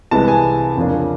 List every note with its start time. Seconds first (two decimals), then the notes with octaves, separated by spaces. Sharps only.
0.11 C2 C3 E3 G#3 B3 A5
0.28 G#5
0.77 F2 C#3 F3 A#3 D4